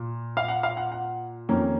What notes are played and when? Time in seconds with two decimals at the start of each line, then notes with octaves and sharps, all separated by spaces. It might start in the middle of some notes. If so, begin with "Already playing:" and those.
Already playing: A#2
0.37 F5
0.48 F#5
0.63 F5
0.77 F#5
0.92 F#5
1.49 F2 D#3 A#3 C#4